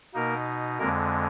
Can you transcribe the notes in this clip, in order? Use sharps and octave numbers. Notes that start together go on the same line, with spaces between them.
B2 A#3 D#4 A#4
F2 D3 G#3 A#3 A#4